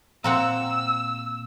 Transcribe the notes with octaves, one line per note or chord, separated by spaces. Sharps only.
A#2 A#3 C4 F#5 E6